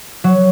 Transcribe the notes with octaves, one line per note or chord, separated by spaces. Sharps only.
F#3